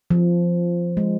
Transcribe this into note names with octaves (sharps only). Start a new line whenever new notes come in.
F3
G#3